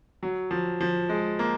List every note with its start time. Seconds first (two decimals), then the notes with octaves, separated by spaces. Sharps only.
0.23 F#3
0.51 F3
0.81 F3
1.09 G#3
1.39 A#3